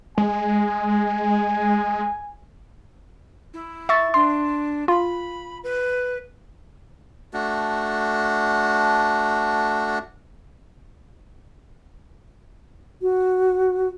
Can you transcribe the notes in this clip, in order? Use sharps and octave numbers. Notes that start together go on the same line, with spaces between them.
G#3 G#5
E4
E5 C#6 A6
D4 C6
F4 B5
B4
A3 D4 F#4
F#4